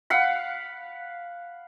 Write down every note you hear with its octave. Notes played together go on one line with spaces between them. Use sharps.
F5 F#5 B5